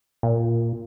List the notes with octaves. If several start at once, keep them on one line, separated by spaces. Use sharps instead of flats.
A#2